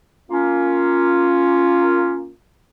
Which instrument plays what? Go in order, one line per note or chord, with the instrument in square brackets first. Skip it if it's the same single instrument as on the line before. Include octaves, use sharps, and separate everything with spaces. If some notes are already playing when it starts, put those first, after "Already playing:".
[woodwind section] A#3 C#4 F4